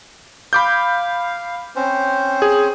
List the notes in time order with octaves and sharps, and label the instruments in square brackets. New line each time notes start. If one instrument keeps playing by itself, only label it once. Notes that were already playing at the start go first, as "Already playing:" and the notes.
[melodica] F5 [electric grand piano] B5 D6 G6
[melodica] C4 C#4 C5
[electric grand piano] G#4